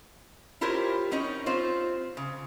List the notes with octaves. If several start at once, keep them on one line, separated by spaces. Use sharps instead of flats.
E4 F4 G4 A#4 C5 C#5
C4 C#4 D#4 C#5
C4 F4 C5
C#3